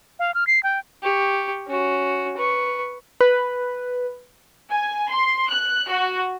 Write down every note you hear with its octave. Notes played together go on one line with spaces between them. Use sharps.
F5
F6
C7
G5
G4 C#6
C#4 F#4
B4 C#6
B4
G#5
C6
F#6
F#4